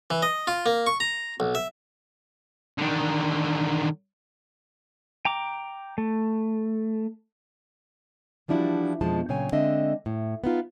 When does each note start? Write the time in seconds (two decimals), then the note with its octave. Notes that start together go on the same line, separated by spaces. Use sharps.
0.10 E3
0.22 D#5
0.47 F4
0.66 A#3
0.86 C#6
1.00 A#5
1.40 B1
1.55 E5
2.78 D3 D#3
5.25 G5 A#5 D6
5.98 A3
8.48 E3 F3 G3 D4 E4 F#4
9.01 F2 B2 F3 G#3 A5
9.29 A#2 C#3 F#3 C#5 G5 G#5
9.52 D3 G#3 C4 D4 D#5 E5
10.06 A2
10.44 B3 D#4 F4